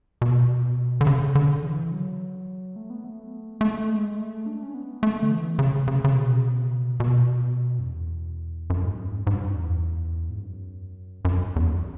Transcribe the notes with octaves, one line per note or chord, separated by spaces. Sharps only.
B2
D3
C#3
D3
E3
F#3
A3
B3
A3
A3
G#3
A3
D4
C#4
B3
A3
D3
E3
C#3
C#3
C#3
B2
B2
F#2
E2
F#2
G#2
F#2
G#2
G#2
F#2
E2
G#2
F#2
F#2
E2
F#2